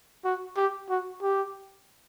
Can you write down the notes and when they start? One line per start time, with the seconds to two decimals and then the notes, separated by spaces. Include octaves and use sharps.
0.25 F#4
0.56 G4
0.90 F#4
1.22 G4